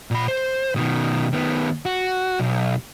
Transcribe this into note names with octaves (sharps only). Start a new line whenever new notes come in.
A#2 B5
C5
B2 D#3
D#3 B3
F#4
B1